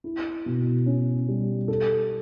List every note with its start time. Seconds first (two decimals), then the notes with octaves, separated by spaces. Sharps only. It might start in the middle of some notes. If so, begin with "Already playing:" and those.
0.04 E4
0.46 B2
0.86 C#4
1.28 G3
1.68 A4